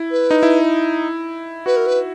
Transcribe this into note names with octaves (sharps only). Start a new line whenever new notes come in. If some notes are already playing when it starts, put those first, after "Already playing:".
Already playing: E4
B4
D#4
E4
F#4 B4
A#4
B4